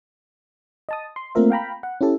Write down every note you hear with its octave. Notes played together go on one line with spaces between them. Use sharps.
D#5 A5 D#6
C6
A3 A#3 C4 F4 A#4 E5
F5 G5 A#5 B5
F#5
C#4 E4 G4 A4